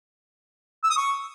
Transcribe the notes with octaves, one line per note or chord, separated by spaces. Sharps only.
E6
D#6
C#6